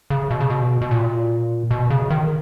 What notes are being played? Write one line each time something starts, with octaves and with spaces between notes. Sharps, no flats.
C#3
B2
C#3
B2
B2
A#2
B2
C#3
D#3